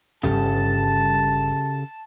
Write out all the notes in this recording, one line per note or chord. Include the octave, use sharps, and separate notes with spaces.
G1 G2 C#3 G4 A4 A5